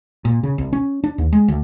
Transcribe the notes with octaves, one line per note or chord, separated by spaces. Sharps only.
A#2
C#3
C2
C#4
D4
D#2
G#3
D2